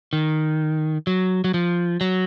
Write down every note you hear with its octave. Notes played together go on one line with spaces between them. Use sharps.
D#3
F#3
F#3
F3
F#3